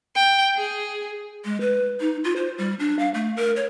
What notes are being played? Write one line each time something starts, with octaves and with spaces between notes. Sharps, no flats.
G5
G#4
G#3
B4
D#4
F4
C5
G3
D4
F5
A3
A#4
C#5